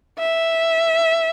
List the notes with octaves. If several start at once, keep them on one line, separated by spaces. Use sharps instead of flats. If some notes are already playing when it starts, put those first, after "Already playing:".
E5